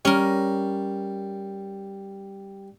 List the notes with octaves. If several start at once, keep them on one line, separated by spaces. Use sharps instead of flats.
G3 C#4 A#4